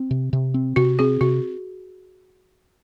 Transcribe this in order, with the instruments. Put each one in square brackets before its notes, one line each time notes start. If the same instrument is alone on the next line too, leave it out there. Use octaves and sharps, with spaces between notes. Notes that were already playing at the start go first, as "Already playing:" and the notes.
Already playing: [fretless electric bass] C4
C3
C3
C4
[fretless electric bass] C3 [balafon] F#4
[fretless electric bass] C4 [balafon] G#4
[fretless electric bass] C3 [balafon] F#4